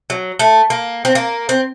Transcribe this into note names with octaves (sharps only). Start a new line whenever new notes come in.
F#3
A3
A#3
C4
A#3
C4